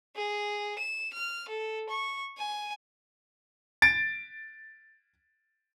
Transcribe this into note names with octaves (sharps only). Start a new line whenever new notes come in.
G#4
E7
F6
A4
C#6
G#5
A6 D7